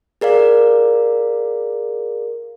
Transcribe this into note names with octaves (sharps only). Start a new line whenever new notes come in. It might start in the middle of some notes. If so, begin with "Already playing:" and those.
G#4 A#4 D5 F5